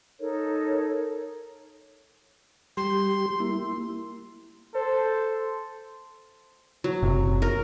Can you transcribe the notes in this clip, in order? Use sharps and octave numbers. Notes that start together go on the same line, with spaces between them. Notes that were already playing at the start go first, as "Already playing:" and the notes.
D#4 A4 A#4 C#5
G3 G4 C6
A#3 E4
A4 C5
F#3
F#1 C3
A#4